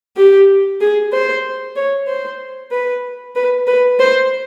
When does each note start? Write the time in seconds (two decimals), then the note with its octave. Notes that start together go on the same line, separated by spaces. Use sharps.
0.16 G4
0.81 G#4
1.13 C5
1.76 C#5
2.08 C5
2.71 B4
3.35 B4
3.67 B4
4.00 C5